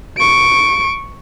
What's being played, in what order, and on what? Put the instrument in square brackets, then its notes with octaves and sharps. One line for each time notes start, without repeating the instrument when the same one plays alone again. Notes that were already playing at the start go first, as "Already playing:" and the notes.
[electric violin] C#6 D7